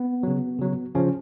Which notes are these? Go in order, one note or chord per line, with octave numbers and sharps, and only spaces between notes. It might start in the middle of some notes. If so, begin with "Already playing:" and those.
Already playing: B3
C#3 F#3
C#3 F#3
C#3 F3 C#4